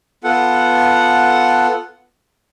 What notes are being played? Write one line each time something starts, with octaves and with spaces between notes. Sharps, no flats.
B3 F4 A4 F#5